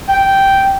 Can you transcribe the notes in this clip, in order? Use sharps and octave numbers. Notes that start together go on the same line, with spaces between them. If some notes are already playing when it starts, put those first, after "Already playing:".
G5